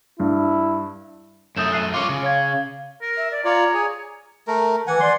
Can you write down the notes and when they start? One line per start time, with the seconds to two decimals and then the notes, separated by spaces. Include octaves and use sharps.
0.20 G2 E4
1.56 F#2 A3 D#6 G6 E7
1.72 F#6 C7 D#7
1.94 F4 C#5 D6
2.09 C#3
2.23 C#5 F5 G#6
3.01 A#4
3.17 E5
3.31 D5
3.45 F4 C#5 D5 A#5
3.74 G#4
4.48 A3 A#4
4.87 E3 F#5 G#5
5.00 D5 C6